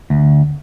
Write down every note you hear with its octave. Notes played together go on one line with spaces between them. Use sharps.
D2